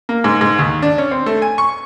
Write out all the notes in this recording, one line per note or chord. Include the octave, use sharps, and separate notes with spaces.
A#3
G#2
G#2
D#2
D4
C#4
C4
A3
G#5
C#6